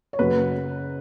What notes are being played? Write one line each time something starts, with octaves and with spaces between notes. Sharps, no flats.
C#5
F#1 F#2 C#3 F#3 B4